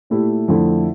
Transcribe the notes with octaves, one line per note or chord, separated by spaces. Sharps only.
A#2 A3 E4 G4
F2 D3 A3 E4 A4